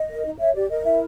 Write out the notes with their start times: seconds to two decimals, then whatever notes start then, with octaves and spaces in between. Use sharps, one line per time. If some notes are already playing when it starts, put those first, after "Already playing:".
Already playing: D#5
0.09 A#4
0.24 D#4
0.40 C#5 E5
0.54 G4 D5
0.69 A#4 D#5
0.85 E4 E5